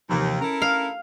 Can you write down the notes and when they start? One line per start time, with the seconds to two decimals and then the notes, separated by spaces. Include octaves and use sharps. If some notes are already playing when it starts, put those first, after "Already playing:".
0.10 D#2 C3 E3 F3
0.41 C#4 E4 A4 A#4
0.62 F5